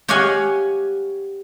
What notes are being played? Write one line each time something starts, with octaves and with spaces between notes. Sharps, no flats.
G4 C#5 D#5 F5 F#5 G#5